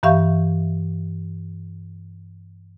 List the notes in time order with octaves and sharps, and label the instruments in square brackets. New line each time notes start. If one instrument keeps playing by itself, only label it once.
[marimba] G2 E3 G4 E5 F5 C#6